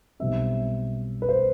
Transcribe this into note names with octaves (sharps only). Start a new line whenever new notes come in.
B1 B2 G3 C4 E5
B4
C5